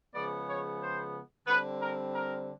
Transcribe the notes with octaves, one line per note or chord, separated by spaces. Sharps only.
C#3 F3 G#3 B3 D5
C#5
C5
D3 G3 C4 B4
A#4
A#4